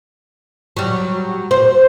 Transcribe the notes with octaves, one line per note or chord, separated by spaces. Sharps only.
F#3 G3
C5